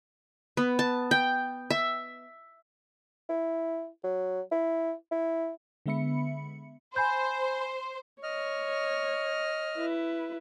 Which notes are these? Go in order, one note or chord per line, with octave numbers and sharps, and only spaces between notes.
B3
A5
G5
E5
E4
F#3
E4
E4
D3 G#3 B3 E5 B5 C#7
C5 G#5 B5 G6
C#5 D#5 F6
E4 B4